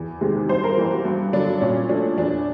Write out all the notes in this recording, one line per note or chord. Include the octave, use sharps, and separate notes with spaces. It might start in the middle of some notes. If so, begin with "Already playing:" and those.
Already playing: E2
C3 D#3 G#3
G2 C5
A#4
E3 G3
F#4
G2
D3 F#3 D4
A#2 C#4
F3 A3 D4
E2 D4